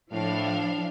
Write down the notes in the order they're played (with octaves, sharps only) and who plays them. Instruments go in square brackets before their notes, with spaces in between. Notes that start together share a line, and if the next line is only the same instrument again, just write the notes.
[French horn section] A2 [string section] F3 D4 F5